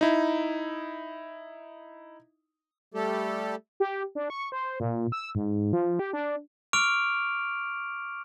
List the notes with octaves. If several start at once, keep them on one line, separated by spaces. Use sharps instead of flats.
D#4 E4
G3 A3 G4 A4
G4
D4
C#6
C5
A#2
E6
G#2
F3
G4
D4
C#6 D6 F6 D7 F7